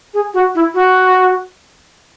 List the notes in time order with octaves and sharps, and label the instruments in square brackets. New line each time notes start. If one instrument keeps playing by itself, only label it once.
[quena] G#4
F#4
E4
F#4